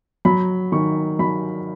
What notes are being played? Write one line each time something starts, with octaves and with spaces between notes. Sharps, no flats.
F#3 B5
D#3 C#6
F#3 B5